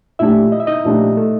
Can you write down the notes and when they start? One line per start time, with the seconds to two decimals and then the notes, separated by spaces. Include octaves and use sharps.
0.19 A#2 F3 A3 D4 E4 G4 E5
0.52 D#5
0.60 E5
0.67 D#4 D#5
0.85 A#2 F3 A3 D4 G4
1.17 A3 A4